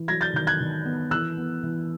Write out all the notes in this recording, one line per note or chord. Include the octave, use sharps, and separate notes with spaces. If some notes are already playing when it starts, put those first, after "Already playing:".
Already playing: E3
F#3 G#6 A#6
G6 A6
D#3 G6
F#6 G#6
D#3
B3
E3 E6 F#6
B3
E3